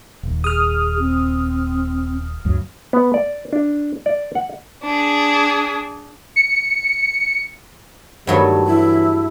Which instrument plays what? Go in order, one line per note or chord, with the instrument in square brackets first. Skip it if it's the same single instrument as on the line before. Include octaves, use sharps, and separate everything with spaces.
[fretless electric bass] D#1 D#2
[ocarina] G#4 [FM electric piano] D#6 F6
[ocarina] C4
[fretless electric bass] D2 G2 F#3
[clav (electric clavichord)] B3
D5
D4
D5
F#5
[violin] D4 G#4
[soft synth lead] C#7
[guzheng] G2 F#3 A3 [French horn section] D#3 G3
[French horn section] E3 [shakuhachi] E4